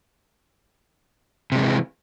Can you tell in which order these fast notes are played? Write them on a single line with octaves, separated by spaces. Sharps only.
C3 G#3 D#3 E3